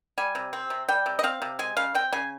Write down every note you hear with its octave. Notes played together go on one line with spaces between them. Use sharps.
G3 G#5
C3
C4
C3
G3 G5
C3
D#5
C4 F5
C3
G#3 G#5
C#3 F5
C4 G5
C#3 G#5